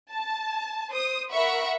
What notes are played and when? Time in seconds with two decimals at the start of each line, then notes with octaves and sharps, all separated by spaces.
0.11 A5
0.90 C5 D#6
1.32 A#4 E5 F#5 B5 C#6